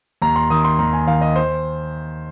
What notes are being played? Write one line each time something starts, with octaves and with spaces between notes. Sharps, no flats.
D#2 A#5
C6
D#3 D#6
C6
D#2 A#5
G#5
D#3 F5
D#5
C5